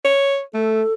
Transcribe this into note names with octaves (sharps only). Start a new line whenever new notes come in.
C#5
A3 A4